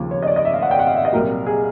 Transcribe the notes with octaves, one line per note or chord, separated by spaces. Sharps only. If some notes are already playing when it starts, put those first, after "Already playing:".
Already playing: D#2 C#3 F3
C#5
D#5
D5
D#5
E5
F5
F#5
G5
F#5
F5
E5
D#5
C2 A#2 F#3 A#4
G#4